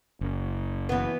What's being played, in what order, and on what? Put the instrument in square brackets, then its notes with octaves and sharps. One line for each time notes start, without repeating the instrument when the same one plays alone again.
[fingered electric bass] F#1
[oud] E3 B3